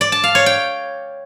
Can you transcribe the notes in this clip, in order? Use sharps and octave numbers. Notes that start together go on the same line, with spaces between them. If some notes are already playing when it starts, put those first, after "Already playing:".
D5
A5
F5
C#5
G5